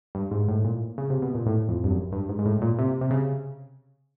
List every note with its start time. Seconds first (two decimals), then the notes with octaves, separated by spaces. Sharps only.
0.15 G2
0.31 G#2
0.48 A2
0.65 A#2
0.98 C#3
1.10 C3
1.22 B2
1.35 A#2
1.46 A2
1.69 F2
1.84 G2
1.91 F#2
2.12 G2
2.29 G#2
2.39 G#2
2.45 A2
2.62 A#2
2.79 C3
3.01 C3
3.11 C#3